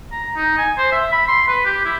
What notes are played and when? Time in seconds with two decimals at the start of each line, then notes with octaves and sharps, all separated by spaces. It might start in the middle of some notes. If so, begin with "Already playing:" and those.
0.12 A#5
0.36 D#4
0.58 G#5
0.78 C5
0.92 E5
1.12 B5
1.28 C6
1.48 B4
1.65 G4
1.85 E4